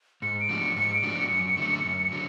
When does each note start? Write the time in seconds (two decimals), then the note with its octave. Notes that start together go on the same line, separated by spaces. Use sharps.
0.22 G#2 C#7
0.40 D7
0.50 F3 A3 D4 F#4
0.59 C#7
0.76 G#2 C#7
0.95 D7
1.03 F3 A3 D4 F#4
1.13 C#7
1.31 F#2
1.57 D3 F#3 A3
1.85 F#2
2.12 D3 F#3